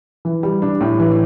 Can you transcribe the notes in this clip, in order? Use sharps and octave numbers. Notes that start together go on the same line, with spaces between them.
E3
G3
D4
A2
E3